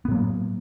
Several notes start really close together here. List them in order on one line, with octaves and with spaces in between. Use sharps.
B3 A2 F#3 A#3